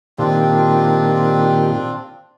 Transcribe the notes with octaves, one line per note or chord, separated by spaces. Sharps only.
A#2 D#3 C4 D4 F4 G4